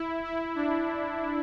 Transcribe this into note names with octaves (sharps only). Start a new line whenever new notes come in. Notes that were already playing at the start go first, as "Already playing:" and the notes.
Already playing: E4
E4
D4